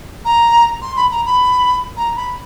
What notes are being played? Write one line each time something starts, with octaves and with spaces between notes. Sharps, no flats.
A#5
C6
B5
A#5
B5
A#5
B5